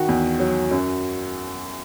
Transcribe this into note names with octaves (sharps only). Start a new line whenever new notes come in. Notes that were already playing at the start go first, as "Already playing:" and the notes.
Already playing: D#3 F#4
E2
F#3
F#2